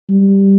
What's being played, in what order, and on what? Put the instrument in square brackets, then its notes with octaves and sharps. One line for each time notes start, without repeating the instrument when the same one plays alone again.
[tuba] G3